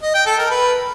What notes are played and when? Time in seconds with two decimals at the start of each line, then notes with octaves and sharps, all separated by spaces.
0.02 D#5
0.14 G5
0.26 A4
0.38 A#4
0.50 B4